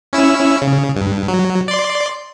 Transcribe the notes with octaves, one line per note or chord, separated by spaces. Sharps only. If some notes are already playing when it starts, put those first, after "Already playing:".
C#4 E4 E6
C#3
G2
F#3
D5 C6